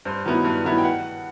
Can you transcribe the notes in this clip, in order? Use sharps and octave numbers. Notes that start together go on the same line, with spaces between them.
G2 C5
D#3 F#3 B3 E4
G2
D#3 F#3 B3 E4
G5
F#5